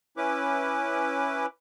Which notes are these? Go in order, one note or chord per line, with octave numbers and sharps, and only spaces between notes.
C#4 E4 B4 D6